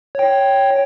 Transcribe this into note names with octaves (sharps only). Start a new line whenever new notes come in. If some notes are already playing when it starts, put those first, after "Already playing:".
C#5 G5